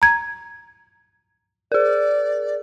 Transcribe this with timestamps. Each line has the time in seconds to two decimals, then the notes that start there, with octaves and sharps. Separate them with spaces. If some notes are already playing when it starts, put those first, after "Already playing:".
0.02 A#5 G#6
1.72 G#4 A#4 D5